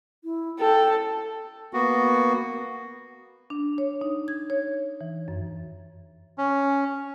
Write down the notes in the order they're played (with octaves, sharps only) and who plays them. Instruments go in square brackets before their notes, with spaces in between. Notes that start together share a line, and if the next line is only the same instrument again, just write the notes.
[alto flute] E4
[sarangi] A4 [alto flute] G5
[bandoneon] A#3 B3 F#4
[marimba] D4
C#5
D#4
G#6
C#5
E3
F#2
[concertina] C#4